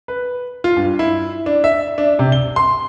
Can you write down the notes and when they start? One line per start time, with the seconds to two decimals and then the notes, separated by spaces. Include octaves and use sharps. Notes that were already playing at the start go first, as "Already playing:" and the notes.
0.08 B4
0.64 F4
0.77 G2
0.99 E4
1.46 D4
1.64 E5
1.98 D4
2.19 C3
2.32 G7
2.56 C6